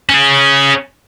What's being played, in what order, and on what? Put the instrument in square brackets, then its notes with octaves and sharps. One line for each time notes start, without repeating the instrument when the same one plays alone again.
[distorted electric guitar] C#4 G#4